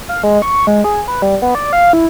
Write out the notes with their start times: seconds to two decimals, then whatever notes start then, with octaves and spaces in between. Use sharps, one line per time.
0.09 F5
0.23 G#3
0.42 C#6
0.67 G#3
0.84 G#4
1.08 B4
1.22 G3
1.42 B3
1.55 D5
1.73 F5
1.93 E4